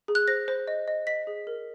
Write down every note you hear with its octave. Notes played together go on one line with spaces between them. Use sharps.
G#4
F#6
C5 A#6
C5
D#5
D#5
D#5 B6
G#4
A#4